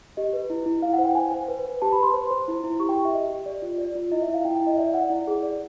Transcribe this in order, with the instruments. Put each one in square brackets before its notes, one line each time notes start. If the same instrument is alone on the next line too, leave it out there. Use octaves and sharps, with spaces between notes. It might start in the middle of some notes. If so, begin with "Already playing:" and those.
[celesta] G4 D#5
B4
E4
E4
E4 F5
F#5
C5
G5
C5 G#5
C5
B4
B4
G4 A5
B5
B4 C6
C5
C5
E4
E4
G4 C#6
G5
G4
E5
G4 D#5
G4
D5
F4
D5
F4
E4 D#5
E5
E4
F5
E4 G5
G5
E4
D#5
D5 E5
D5 F#5
E4
G#4
D5